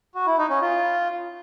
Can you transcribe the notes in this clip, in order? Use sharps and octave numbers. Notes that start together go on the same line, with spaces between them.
F#4
E4
D#4
C#4
F4